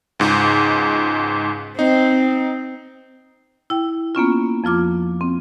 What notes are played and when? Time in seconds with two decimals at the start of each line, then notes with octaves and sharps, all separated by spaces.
0.19 C#2 G#2
1.79 C4 D#4
3.70 E4 G5
4.15 A#3 B3 C#4 F4
4.64 F2 F3 F4 D6
5.21 C4